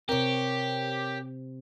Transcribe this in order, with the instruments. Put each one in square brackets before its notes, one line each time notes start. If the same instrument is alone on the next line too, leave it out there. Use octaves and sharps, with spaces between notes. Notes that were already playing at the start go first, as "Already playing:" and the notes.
[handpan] C3 C4 [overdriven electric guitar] G4 [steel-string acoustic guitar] A#4 C#5